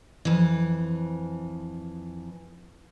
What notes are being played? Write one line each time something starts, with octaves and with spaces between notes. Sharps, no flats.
F2 E3